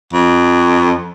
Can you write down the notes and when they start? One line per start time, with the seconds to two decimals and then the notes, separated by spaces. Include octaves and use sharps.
0.13 F2